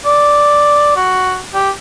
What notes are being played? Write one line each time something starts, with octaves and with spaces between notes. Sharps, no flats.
D5
F#4
G4